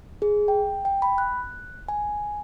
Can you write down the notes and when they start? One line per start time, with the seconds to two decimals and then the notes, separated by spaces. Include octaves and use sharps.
0.22 G#4
0.48 G5
0.85 G5
1.02 B5
1.18 F#6
1.88 G#5